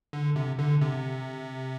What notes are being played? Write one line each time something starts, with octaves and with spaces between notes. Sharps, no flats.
D3
C3
D3
C3